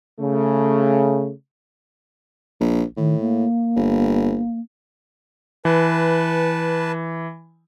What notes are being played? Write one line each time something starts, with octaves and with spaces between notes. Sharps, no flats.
C#3 A3
A#1
A2 D#3
A#3
G1
E3 B4 A5